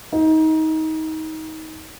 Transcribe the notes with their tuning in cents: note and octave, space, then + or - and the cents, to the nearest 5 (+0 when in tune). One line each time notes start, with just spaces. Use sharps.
D#4 +25